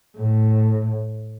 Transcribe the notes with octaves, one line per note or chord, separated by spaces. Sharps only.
A2